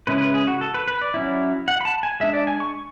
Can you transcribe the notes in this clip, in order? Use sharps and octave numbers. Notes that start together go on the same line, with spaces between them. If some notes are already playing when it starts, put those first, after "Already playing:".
C#3 G#3 C#4 E4 B4
B4
G#4
F#4
A4
B4
B4
D5
F#3 C#4 E4
F#5
B5
A5
G#5
G#3 D4 E5
D5
G#5
C#6